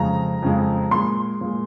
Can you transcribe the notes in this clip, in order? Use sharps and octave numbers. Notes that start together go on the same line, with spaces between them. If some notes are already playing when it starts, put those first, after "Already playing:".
Already playing: F2 C#3 F3 G#3 A#5
F2 C#3 F3 G#3
A#2 G#3 C6
A#2 G#3